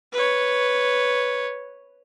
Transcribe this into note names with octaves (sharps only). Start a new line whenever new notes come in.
B4 C#5